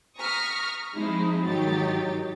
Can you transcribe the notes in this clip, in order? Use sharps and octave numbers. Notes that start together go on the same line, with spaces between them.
A#5 C#6 D#6 F6 A#6 B6
F3 G#3 C4 D#4 E4
G#2 D#3 F#3 D#4 G4 A6